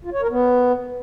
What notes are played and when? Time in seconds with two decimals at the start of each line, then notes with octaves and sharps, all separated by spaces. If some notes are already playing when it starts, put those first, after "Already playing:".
0.05 F4
0.13 C#5
0.22 A#4
0.30 B3